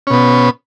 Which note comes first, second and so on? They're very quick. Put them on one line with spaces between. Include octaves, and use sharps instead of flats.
C#4 B2 B3